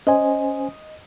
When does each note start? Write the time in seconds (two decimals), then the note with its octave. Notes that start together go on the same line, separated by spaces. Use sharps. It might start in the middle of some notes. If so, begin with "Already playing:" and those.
0.07 C#4 C5 D#5 G#5